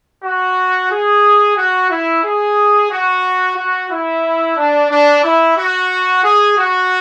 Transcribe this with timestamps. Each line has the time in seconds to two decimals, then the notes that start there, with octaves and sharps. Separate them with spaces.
0.24 F#4
0.91 G#4
1.57 F#4
1.90 E4
2.24 G#4
2.91 F#4
3.57 F#4
3.90 E4
4.57 D4
4.90 D4
5.23 E4
5.57 F#4
6.24 G#4
6.57 F#4